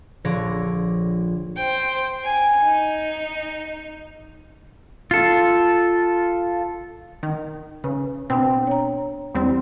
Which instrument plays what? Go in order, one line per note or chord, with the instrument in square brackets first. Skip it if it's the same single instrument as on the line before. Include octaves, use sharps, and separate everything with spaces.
[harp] A#1 D3 F3 C#5 D5 A#6
[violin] C5 G5
G#5
D#4
[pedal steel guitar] F4 A4
[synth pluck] D#3
[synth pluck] C#3 [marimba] B4
[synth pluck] B2 C4 [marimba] D4 G5
[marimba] C#5 A#5
[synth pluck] E2 G3 C4